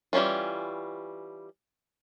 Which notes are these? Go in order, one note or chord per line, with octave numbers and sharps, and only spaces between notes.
E3 G3 A#3 C#4 F4